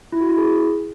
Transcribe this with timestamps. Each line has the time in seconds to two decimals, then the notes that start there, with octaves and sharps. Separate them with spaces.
0.12 E4
0.21 F#4
0.29 E4
0.37 G#4